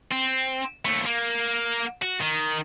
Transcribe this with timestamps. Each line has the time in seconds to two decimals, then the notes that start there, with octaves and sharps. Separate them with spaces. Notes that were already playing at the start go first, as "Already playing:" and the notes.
0.11 C4
0.85 D#2 A3
1.06 A#3
2.02 F#4
2.21 D#3